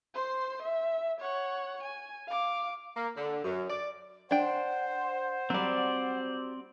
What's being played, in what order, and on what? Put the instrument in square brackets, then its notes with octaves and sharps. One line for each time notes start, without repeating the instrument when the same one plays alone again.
[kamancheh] C5 C6
E5
C#5 F#5
G#5
F5 D6
[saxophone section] A#3
D3
F#2
D5
[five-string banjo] D4 G5 [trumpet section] C5 [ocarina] F#5
[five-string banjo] F#3 G3 [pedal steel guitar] C4 D5